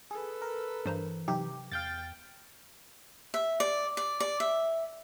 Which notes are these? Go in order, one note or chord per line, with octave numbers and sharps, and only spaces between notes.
G#4 A4 B4
A#4
G2 E3 C5 A#5
C3 F#3 D#4 G4
E2 F5 G5 G6 A6
E5
D5
D5
D5
E5